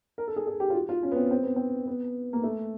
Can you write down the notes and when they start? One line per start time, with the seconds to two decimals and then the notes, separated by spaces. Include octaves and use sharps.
0.18 A#4
0.28 A4
0.36 G#4
0.47 G#4
0.60 G4
0.70 F4
0.74 F#4
0.89 F4
1.03 C#4
1.12 B3
1.16 C4
1.31 C4
1.43 B3
1.56 C4
1.87 B3
2.33 A#3
2.43 A3